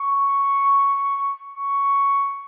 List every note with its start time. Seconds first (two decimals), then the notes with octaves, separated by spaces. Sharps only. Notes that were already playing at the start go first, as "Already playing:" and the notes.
Already playing: C#6
1.54 C#6